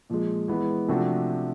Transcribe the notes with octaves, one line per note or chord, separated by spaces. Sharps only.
A#2 F3 G#3
E3 G#3 B3
C3 F3 A3 D4 F#4